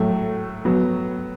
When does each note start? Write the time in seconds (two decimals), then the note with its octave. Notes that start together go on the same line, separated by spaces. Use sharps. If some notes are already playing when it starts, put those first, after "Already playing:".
Already playing: A2 F#3 A3
0.65 F#3 B3 F#4